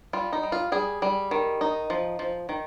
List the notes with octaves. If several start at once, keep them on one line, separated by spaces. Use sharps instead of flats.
G3 F4
D#4
G3
F4
G3 G#4
G3
D#3
D#4
F3
F3
D#3